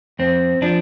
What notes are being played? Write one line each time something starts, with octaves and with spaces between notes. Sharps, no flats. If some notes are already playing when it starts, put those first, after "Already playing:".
F2 C4
F3 D4